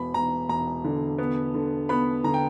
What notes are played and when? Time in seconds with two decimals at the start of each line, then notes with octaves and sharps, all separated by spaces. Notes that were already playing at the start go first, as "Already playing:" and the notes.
Already playing: E1 B5
0.14 E1 A#5
0.49 E1 A#5
0.84 D3
1.19 B3
1.54 D3
1.89 B3 B5
2.24 D3 A#5
2.34 G5